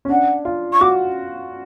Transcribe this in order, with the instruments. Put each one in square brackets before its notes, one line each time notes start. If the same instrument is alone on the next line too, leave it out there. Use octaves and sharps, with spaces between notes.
[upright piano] C#4
[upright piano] D4 [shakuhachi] F#5
[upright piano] F4
[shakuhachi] C#6
[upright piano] F#4 [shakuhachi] D6